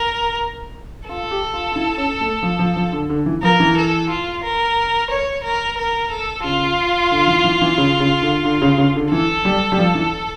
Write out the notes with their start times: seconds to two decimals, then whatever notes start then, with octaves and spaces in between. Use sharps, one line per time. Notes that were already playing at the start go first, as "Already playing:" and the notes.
Already playing: A#4
1.08 F4 A4
1.31 G4
1.54 F4
1.71 F4
1.76 E4
1.98 C#4
2.21 A3
2.43 F3
2.59 F3
2.76 F3
2.92 D3
3.09 D3
3.26 E3
3.42 F3 A#4
3.60 E3
3.77 A4
4.09 F4
4.44 A#4
5.10 C#5
5.44 A#4
5.78 A#4
6.11 A4
6.44 C#3 F4
7.11 D3
7.27 E3
7.44 E3
7.62 E3
7.78 C#3
8.00 C#3
8.22 D3
8.44 D3
8.62 C#3
8.78 C#3
8.95 D3
9.11 E3 A4
9.45 G3
9.72 G3
9.78 F3
9.95 E3